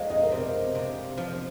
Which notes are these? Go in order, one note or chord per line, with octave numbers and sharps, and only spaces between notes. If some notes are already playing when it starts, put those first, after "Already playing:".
Already playing: F3 G#3 D#5 F5 A#5
D#5
A#4
C3 C5
C3
F3